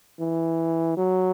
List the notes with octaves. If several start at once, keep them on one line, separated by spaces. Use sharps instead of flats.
E3
F#3